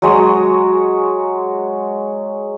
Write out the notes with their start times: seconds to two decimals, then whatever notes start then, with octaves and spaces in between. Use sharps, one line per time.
0.02 F#3 G#3 C#5